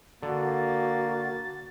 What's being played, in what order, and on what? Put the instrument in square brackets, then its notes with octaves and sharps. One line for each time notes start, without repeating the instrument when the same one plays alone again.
[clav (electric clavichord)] D3 [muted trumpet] A#3 [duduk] F#4 [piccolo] A6